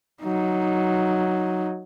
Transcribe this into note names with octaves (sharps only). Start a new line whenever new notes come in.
F#3 D#4